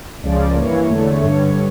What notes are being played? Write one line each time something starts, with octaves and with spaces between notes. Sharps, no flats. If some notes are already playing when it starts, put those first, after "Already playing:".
C#2 C#3 F3 D5
A#4
G2 E3 A#3 C#5
E2 D3 A3
G2 D3 G3 C#5